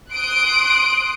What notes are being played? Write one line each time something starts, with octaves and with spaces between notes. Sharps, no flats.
C6 D#6 F#6 D7